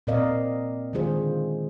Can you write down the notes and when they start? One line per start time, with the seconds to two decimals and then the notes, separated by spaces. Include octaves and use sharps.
0.07 A#2 C4 A#4 D5 D#5 F5
0.93 D3 D#3 G#3 F4 G#4 C5